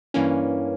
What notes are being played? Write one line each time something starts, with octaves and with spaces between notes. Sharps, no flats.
G2 E3 A#3 C#4